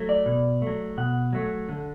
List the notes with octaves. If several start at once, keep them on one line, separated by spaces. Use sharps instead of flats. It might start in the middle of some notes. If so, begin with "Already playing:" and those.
Already playing: F#3 A3
D5
B2
F#3 A3
B2 F#5
F#3 A3
D3